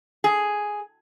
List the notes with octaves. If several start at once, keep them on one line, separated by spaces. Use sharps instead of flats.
G#4